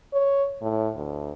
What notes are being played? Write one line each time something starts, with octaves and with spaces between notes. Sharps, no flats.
C#5
A2
D2